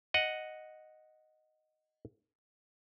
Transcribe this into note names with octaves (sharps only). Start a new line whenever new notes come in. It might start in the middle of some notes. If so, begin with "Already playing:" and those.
D#5 F#5